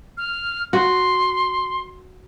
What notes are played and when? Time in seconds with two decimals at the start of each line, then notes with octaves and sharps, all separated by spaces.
0.17 F6
0.73 F#4 C6